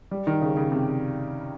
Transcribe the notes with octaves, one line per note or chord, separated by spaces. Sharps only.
G3
D#3
C#3
C#3
C3